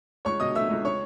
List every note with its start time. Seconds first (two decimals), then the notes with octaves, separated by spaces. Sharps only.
0.25 C#2 C#5 C#6
0.40 B2 D#5 D#6
0.55 A3 E5 E6
0.70 C#2
0.85 C#5 C#6